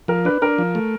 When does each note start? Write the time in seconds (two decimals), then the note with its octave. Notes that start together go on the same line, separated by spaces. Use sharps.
0.08 F3 A#4
0.25 D4 B4
0.42 D4 A#4
0.58 F3
0.75 A3